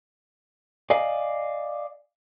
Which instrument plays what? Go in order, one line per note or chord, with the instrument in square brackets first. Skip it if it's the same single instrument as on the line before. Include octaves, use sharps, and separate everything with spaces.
[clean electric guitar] D5 D#5 F5 G#5